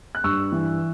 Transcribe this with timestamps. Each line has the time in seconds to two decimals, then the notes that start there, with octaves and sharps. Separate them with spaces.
0.15 F#6
0.24 G2 C#6 E6
0.52 E3